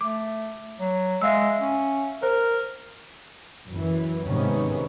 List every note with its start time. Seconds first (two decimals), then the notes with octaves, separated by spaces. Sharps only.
0.01 A3 D6
0.80 F#3
1.22 G#3 E5 F5 E6
1.60 C#4
2.23 A#4 C5
3.70 F#2 E3
4.26 G#2 C3 D#3 B3 C#4